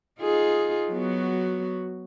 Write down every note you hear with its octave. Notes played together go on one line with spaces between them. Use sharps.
D#4 F4 G#4
F#3 B3 F#4